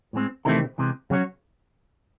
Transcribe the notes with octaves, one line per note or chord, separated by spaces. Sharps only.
A2 G#3 C4
C3 D#3 E3 A3 C4 E4 A4
C3 E3 G#3
C#3 F#3 C#4 F#4 C#5